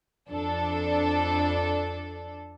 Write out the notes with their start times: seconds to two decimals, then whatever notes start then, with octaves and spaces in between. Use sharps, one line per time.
0.29 F2 D4 A4